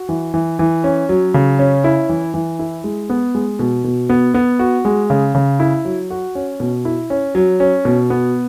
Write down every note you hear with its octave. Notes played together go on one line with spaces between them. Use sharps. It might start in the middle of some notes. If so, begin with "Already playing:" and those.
Already playing: F#4
E3
E3
E3
C#4
F#3
C#3
C#4
E4
E3
E3
E4
G#3
B3
G#3
B2
B2
B3
B3
F#4
G#3
C#3
C#3
E4
F#3
F#4
C#4
B2
E4
C#4
F#3
C#4
B2
B3